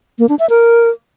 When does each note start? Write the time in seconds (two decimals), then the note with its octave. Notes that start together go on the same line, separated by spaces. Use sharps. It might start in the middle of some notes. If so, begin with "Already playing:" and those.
0.19 A#3
0.29 D4
0.39 E5
0.50 A#4